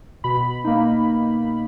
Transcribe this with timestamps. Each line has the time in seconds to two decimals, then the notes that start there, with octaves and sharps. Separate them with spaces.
0.24 B2 B5
0.64 A#3 D#4